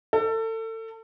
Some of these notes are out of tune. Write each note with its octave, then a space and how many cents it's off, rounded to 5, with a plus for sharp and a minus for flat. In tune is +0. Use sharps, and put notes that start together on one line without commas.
A4 +30